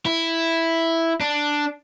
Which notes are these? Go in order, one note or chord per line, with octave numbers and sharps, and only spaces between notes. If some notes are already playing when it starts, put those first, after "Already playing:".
E4
D4